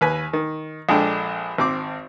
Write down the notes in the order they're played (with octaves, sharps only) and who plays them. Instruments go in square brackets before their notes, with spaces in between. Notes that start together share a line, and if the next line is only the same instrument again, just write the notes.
[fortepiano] D#2 B4 G#5
D#3
A#1 G#3 D4 A4 G5
G#1 C4 D6